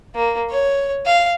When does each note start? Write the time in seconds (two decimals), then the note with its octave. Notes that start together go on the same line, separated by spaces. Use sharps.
0.15 A#3
0.50 C#5
1.06 F5